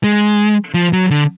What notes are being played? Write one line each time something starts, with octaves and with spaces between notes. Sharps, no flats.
G#3
F3
F#3
D3